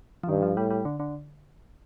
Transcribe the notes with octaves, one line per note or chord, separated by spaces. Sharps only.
F3
G2 D#3
F3
A2 G3
G3
D3
D3